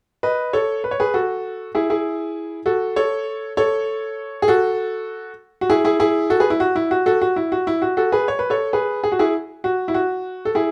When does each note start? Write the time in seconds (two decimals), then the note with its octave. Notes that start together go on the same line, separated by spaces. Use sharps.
0.23 B4 D#5
0.53 A4 C#5
0.84 B4
0.91 C#5
1.00 G#4 B4
1.14 F#4 A4
1.75 E4 G#4
1.90 E4 G#4
2.66 F#4 A4
2.96 A4 C#5
3.57 A4 C#5
4.42 G#4
4.48 F#4 A4
5.61 F#4
5.70 E4 G#4
5.85 E4 G#4
6.00 E4 G#4
6.30 F#4 A4
6.40 G#4 B4
6.50 E4
6.60 F#4
6.76 E4
6.91 F#4
7.06 F#4 A4
7.21 F#4
7.36 E4
7.52 F#4
7.67 E4
7.82 F#4
7.97 F#4 A4
8.12 G#4 B4
8.28 C#5
8.39 B4
8.50 A4 C#5
8.73 G#4 B4
9.04 G#4
9.12 F#4
9.19 E4 G#4
9.64 F#4
9.88 E4
9.94 F#4
10.45 A4
10.55 E4 G#4